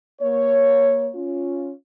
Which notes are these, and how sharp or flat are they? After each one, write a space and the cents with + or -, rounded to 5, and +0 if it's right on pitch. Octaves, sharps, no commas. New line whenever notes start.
A#3 +15 C#5 +0
C#4 +0 F4 +0